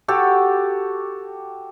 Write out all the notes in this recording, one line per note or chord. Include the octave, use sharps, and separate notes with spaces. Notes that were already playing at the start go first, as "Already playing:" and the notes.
F#4 G4 A4